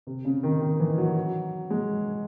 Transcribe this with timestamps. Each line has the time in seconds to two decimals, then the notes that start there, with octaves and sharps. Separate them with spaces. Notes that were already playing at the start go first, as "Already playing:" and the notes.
0.07 C3
0.25 C#3
0.43 D#3
0.61 D#3
0.80 E3
0.98 F#3
1.70 G#3